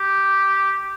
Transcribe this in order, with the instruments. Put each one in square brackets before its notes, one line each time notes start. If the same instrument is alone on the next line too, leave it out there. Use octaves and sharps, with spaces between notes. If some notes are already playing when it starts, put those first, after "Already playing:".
Already playing: [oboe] G4